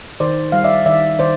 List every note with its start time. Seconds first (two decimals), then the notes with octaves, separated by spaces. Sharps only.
0.20 D#3 C5 D5
0.52 G3 F5
0.64 D5 E5
0.86 D#3 D5 E5
1.19 D#3 C5 D5